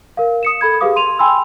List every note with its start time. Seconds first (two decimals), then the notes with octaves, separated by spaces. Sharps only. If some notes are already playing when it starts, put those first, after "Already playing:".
0.17 A#4 F5
0.43 D#6 C#7 E7
0.61 A4 B5 G#6
0.81 G4 G#4 B4 F5 D6 D#6
0.96 C6 D#7 F7
1.19 G5 G#5 B5 C6 E6